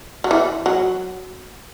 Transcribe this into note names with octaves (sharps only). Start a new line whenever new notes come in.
F#3
E3
F#3